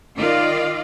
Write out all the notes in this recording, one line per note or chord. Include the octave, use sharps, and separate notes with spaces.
D#3 F4 D5 D#5 F5